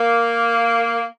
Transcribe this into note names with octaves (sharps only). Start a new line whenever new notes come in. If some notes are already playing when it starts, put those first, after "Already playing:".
Already playing: A#3